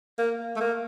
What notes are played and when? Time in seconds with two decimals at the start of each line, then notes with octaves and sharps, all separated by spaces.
0.18 A#3
0.56 A3
0.60 A#3